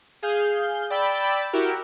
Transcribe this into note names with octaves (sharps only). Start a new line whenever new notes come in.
G#4 F5 G6
D5 G5 B5 E6 A6
E4 F#4 G4 A#4